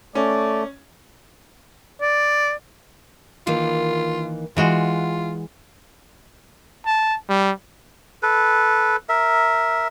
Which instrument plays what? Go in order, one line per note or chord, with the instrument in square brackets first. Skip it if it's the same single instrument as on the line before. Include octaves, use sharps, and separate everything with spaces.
[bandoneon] A3 [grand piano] C#4 [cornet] D5
[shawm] D5
[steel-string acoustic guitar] D#3 E3 A#3 [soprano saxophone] F4
[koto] E3 G#3 F#4 [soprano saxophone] F4 [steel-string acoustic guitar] G5
[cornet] A5
G3
[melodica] A4 B4
A#4 E5